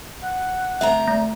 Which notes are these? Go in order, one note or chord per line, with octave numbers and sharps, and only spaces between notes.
F#5
D2 C4 E5 A#5
A3